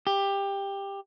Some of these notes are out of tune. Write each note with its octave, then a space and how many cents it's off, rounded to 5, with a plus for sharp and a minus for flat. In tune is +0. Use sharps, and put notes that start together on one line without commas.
G4 +15